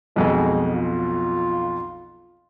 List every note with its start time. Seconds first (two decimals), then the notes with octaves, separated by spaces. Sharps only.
0.16 B1 F2 B2 G#3
0.74 F4